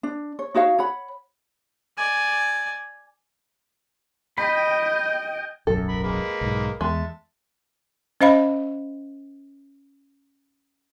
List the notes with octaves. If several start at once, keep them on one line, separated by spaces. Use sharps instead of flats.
D4
C#5
D#4 F#4 C#5 F5
C#5 F#5 B5
D5 G#5
D#5 G5 B5
D1 B1 F#2 A4
A#4 B5
G#3 A#3 B4
B1 G#2
E2 G#3 E5 A5
C#4 C5 D#5 F5 B5